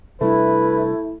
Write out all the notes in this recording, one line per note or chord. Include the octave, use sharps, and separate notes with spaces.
C3 G3 A3 D4 E4 B4